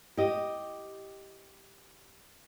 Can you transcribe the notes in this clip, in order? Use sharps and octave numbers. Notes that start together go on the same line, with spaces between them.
G4 D#5